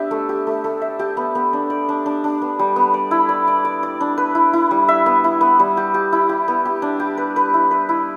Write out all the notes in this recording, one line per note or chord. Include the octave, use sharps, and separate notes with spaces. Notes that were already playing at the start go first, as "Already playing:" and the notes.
Already playing: B3 D4 G4 E5
A3
G4
A3
A3
E5
G4
B3
B3
D4
D5
D4
D4
D4
B3
G3
B3
D5
E4
D5
D5
D5
D5
D4
B4
E4
E4
G3
E5
B3
E4
B3
G3
G4
G4
E4
G4
B3
G4
D4
G4
B4
B4
E4
B4
E4